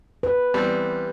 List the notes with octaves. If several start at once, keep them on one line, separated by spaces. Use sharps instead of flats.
B4
E2 G3 C4